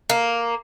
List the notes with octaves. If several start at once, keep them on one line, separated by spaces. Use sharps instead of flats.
A#3